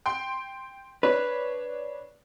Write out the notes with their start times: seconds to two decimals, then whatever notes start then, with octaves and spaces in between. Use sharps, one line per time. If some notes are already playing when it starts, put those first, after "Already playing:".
0.06 G5 C6
1.03 D4 B4 C#5